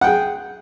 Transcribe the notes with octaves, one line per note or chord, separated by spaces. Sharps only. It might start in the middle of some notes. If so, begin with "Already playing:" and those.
G#4 F#5 G5